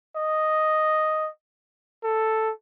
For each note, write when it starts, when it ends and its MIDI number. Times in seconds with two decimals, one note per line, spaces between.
0.16 1.29 75
2.04 2.51 69